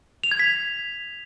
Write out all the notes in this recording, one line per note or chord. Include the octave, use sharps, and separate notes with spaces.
F7
G#6
B6